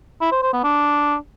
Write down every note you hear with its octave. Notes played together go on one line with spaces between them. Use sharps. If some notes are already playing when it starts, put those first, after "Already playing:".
E4
C5
C5
B3
D4